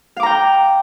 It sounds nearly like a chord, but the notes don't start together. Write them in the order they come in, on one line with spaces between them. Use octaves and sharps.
F5 D6 A#5 G5